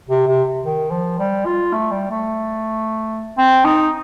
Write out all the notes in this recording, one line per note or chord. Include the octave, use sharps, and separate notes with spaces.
C3
C3
D#3
F3
G3
F4
A3
G3
A3
C4
D#4